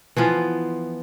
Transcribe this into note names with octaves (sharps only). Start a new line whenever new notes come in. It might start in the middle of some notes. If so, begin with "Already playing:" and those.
E3 F3 B3 F4